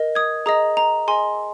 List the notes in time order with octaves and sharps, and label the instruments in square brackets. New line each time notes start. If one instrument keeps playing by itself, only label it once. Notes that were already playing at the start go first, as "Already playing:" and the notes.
Already playing: [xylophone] A#4 D#5
D#6 G#6
G#4 D#5 A#5 D#6
A#5
G#4 D#5 G#5 C6